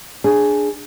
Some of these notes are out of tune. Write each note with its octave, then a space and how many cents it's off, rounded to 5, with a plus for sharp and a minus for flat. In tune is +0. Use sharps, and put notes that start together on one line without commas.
D4 +5 G#4 +0